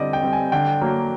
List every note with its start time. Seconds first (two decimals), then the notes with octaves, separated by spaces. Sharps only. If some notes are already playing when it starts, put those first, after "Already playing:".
Already playing: D3 G3 C4 D5 D#5
0.13 G5
0.23 G3 C4
0.33 G#5
0.52 D3 G5
0.81 F#3 A#3